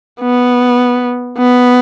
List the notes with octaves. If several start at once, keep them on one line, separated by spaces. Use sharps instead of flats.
B3
B3